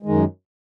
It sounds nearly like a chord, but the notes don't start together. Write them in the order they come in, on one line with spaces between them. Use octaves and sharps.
G#3 D#3 F#2